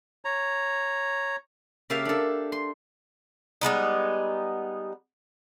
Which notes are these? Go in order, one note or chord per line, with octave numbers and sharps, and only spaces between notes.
C#5 A#5
C#3 A#3 G4 E5 F5 A5
D4 A4
C6
G3 G#3 B3 D#4